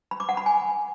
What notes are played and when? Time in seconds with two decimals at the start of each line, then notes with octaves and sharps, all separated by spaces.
0.11 B5
0.20 D6
0.29 F#5
0.37 B5
0.46 G#5